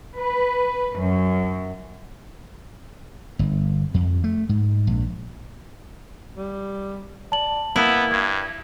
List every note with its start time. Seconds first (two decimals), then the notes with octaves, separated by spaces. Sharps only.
0.17 B4
0.97 F#2
3.39 G1
3.94 F2
4.24 A3
4.49 G#2
4.87 A#1
6.37 G3
7.32 D5 A5 F#7
7.76 A#3 B3 E4
8.11 G2 G#6